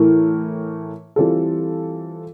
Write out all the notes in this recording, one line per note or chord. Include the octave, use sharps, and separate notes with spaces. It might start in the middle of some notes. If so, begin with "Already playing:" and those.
Already playing: A2 E3 A3 E4 A#4
E3 G3 C4 F4 A4